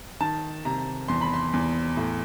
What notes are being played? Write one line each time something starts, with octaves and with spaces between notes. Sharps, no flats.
D#3 A5
C3 A#5
E2 C6
B5
C6
E2
A2